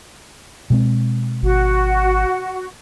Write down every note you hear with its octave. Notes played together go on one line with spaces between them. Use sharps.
B2 G#3 C4
G#1 F#4